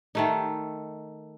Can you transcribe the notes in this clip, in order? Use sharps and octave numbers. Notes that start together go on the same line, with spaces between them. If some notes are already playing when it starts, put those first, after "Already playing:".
D#3 A3 D#4